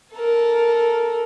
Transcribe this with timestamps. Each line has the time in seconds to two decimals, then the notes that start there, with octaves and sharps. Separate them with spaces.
0.14 A4 A#4